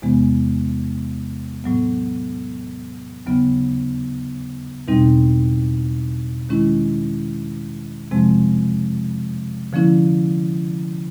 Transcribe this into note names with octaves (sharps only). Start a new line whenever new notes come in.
E2 C3 E3 G#3 B3
A2 F#3 B3
D#2 C#3 F#3 B3
E2 B2 G3 C4 D#4
D#3 G#3 C#4 E4
F2 C3 F3 G#3 C4
D3 F3 A#3 C#4 E4